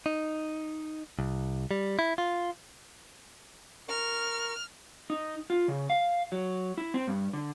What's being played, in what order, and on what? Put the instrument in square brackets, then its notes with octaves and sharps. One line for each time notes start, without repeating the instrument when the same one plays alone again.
[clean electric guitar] D#4
C2
G3
E4
F4
[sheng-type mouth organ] A#4 C#6 [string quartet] F6
[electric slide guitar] D#4
F4
C#3
F5
F#3
E4
C4
G2
D3